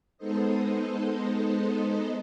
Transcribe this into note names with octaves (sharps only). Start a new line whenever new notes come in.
G#3 B3 D#4 A4 C5 D#5